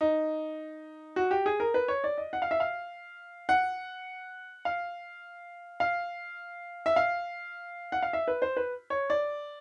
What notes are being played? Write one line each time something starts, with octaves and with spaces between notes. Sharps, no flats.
D#4
F#4
G4
G#4
A#4
B4
C#5
D5
D#5
F#5
F5
E5
F5
F#5
F5
F5
E5
F5
F#5
F5
E5
B4
C5
B4
C#5
D5